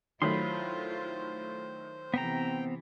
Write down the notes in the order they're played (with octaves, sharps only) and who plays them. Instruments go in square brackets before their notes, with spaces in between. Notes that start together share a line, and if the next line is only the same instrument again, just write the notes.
[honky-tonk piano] D#3 F#3 A3 [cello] E4 F4 [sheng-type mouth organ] C5 [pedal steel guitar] B5 C6
[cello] C3 E3 [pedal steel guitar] B3 C4 A#5 [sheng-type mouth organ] G5